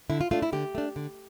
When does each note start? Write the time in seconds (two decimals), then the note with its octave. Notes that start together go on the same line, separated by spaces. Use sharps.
0.10 D3 E4
0.21 F4
0.31 A3 D4 F4
0.42 E4
0.53 D3 G4
0.75 A3 D4
0.96 D3